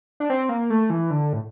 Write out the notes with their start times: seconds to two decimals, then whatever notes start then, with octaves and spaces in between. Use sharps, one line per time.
0.20 D4
0.30 C4
0.49 A#3
0.70 A3
0.90 E3
1.11 D3
1.33 A2